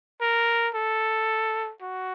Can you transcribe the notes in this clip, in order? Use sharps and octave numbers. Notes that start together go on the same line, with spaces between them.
A#4
A4
F#4